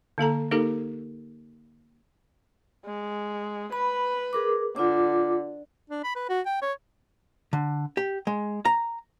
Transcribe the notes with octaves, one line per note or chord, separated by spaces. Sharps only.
D3 A#3 A4 A#5
A#3 D#4 G4 A4 A#4
G#3
B4 B5
G#4 A#4 D6
D3 F4 D6
D4
B5
B4
F#4
G5
C#5
D3
G4
G#3
A#5